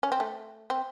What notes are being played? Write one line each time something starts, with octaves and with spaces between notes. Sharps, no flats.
C#4
C4
A3
C4